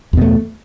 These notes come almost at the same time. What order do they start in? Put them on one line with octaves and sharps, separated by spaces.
E2 B2 A3